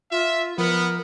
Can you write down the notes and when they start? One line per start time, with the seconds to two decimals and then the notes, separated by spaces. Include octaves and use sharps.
0.11 F4 E5
0.58 F3 B3 A#4